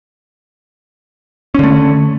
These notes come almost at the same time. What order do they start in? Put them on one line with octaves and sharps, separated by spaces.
C#4 D3 A3